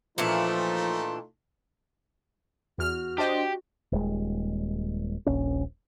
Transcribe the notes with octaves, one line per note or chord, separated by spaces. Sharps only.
A#2 E3 F3 A3 D4 D#4 F4
E2 F#4 F6
D4 G4 C5 D#5 G5
D#1 G#3
D#1 A#1 C#4